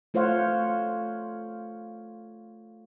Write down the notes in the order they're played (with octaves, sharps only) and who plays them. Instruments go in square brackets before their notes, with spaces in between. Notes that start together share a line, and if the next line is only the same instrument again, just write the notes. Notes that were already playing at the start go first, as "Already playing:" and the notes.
[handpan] A3 F4 C5 C#5 F5 F#5